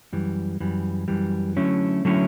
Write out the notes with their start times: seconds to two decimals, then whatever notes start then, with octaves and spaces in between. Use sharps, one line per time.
0.13 F#2 E3 G3
0.60 F#2 E3 G3
1.08 F#2 E3 G3
1.56 D3 F#3 A3 C#4 E4
2.05 D3 F#3 A3 C#4 E4